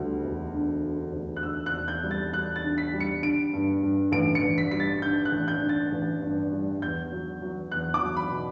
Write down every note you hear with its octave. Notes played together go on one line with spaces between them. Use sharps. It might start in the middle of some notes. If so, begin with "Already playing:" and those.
Already playing: D2 G3
E1
D3
D3
D2
F#6
D2 E6
F#6
E1
G6
G3
A6
G3 F#6
A6
D3
B6
G3
C#7
D3 D7
G2
G2
A1 D7
C#7
A1
B6
G3 B6
A6
D3 G6
F#6
A1
G6
D3
A6
A1
G2
G3
E2 G6
F#3
F#3
E2 F#6
D6
F#3
B5
B2